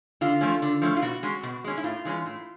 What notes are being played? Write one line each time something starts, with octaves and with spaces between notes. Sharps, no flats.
D3 F4
F3 A3 C#4
D3
F3 A3 C#4
F4
B2 F#4
G#3 C#4
B2
G#3 C#4
E4
A2 F4
E3 G#3 C#4
A2